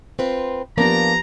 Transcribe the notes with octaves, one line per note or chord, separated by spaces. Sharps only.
C4 F4 B4
F3 A#3 B3 D4 G4 D5 A#5